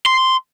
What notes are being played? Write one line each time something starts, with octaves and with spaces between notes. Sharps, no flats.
C6